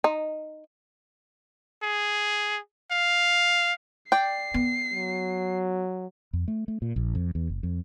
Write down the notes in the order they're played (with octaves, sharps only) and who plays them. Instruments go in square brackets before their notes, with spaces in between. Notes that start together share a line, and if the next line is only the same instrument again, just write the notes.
[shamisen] D#4
[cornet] G#4
F5
[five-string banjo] D5 G5 [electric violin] C7
[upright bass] B3
[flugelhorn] F#3
[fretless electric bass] F2
A3
A3
A#2
A#1
F2
E2
F#1
F2